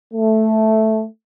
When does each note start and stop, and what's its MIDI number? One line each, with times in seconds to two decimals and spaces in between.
0.14 1.04 57